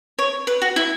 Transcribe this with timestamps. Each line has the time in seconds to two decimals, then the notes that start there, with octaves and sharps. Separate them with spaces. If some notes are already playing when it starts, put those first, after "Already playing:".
0.19 C#5
0.47 B4
0.62 F#4
0.76 E4